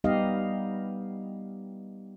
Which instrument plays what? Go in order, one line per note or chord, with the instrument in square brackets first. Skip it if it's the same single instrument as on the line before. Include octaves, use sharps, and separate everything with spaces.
[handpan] G3 B3 D#4 G4 D#5 F5